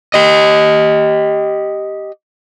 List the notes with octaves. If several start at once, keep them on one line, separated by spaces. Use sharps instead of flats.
G4 D#5